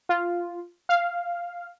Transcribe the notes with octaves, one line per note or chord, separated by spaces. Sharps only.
F4
F5